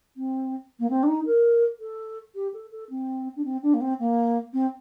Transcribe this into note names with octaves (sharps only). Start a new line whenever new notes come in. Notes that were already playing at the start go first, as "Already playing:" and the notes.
C4
A#3
C4
D4
D#4
A#4
A4
G4
A4
A4
C4
D4
C4
D4
A#3
C4
A#3
C4